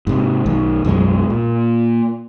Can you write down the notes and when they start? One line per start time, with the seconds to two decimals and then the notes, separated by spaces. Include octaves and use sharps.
0.07 G#2 C3
0.46 B1 D#3
0.85 B1 F#2 D#3 G#3
1.30 A#2